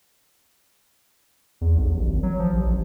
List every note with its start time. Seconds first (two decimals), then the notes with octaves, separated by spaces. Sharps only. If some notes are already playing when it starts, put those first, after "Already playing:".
1.61 E2
1.75 B1
1.94 A1
2.07 G#1
2.23 F#3
2.39 F3
2.53 A1
2.67 A1